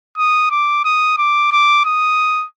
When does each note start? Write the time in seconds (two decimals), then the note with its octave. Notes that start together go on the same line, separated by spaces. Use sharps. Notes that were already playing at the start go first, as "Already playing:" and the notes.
0.18 D#6
0.51 D6
0.84 D#6
1.18 D6
1.52 D6
1.85 D#6